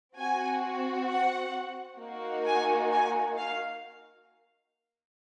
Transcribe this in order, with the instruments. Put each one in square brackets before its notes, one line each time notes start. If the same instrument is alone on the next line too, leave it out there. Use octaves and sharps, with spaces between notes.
[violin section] C4 F#4 G#5
F#5
A#3 D#4 F#4
G#5
G#5
F5